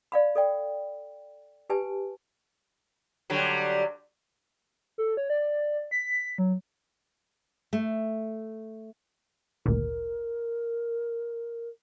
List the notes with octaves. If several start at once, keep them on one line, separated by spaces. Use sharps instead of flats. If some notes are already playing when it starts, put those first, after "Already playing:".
D5 F5 B5
A4 D5 G5
G4 B4 G#5 A5
D3 F#3 G3
A4
C#5
D5
B6
F#3
A3
G#1 D2 A#2 A#4